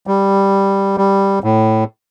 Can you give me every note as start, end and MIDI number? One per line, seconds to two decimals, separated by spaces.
0.07 0.97 55
0.98 1.39 55
1.44 1.84 45